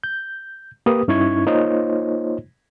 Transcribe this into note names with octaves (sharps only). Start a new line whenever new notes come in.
G6
A#3 G4 B4 D#6
G2 C#4 D#4 E4 C#6 G#6
A#3 D#4 F4 C5 C#5 D#5